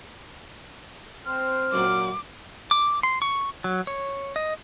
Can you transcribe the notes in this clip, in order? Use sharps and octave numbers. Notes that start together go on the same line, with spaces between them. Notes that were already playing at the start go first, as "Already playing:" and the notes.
C4 C5 F6
F#2 A#2 F#3 D6
D6
C6
C#6
F#3
C#5
D#5